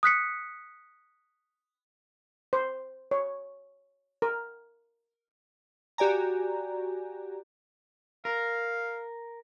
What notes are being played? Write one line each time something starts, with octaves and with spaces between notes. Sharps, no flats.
D#6 F#6 B6 C#7
C5
C#5
A#4
F#4 G4 D5 G#5 A#5
A#4 F5